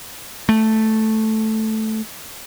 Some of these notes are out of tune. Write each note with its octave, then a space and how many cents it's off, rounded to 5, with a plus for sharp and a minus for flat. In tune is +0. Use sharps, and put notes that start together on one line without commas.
A3 -5